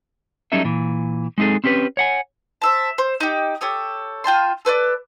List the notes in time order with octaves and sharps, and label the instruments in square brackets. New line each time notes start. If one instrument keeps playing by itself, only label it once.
[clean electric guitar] F#3 G3 C#4 D#4 A4 E5
A#2 E3
G#3 C4 D#4 G#4 A4
C4 C#4 G4 A4 B4
C#5 F#5 G#5
[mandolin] C5 E5 A5
C5
D#4 G4
G4 A4 C#5 D#6
F4 G5 A5 C6
A4 B4 C#5 D5